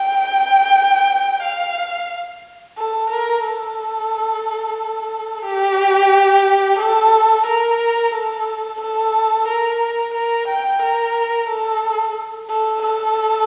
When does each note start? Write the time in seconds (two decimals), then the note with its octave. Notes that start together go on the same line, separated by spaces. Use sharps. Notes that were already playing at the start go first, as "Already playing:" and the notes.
Already playing: G5
1.43 F5
2.78 A4
3.10 A#4
3.44 A4
5.45 G4
6.79 A4
7.47 A#4
8.14 A4
8.81 A4
9.48 A#4
10.14 A#4
10.48 G5
10.82 A#4
11.49 A4
12.50 A4
12.82 A4